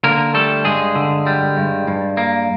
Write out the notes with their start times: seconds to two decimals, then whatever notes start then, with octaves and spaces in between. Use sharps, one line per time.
0.04 D3 A#3 A#4
0.34 G3 A3 A4
0.65 G2 G#3 G#4
0.95 D3
1.26 G3
1.57 G2
1.87 G2
2.17 A#3